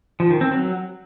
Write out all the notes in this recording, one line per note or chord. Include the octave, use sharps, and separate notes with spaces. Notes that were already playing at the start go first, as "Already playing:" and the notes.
F3
D#3
C4
F#3